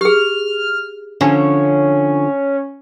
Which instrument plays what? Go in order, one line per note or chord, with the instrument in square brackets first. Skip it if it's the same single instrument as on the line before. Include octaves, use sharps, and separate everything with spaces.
[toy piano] G4 G#4 [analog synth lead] F6
[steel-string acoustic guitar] D3 F3 [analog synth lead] C#4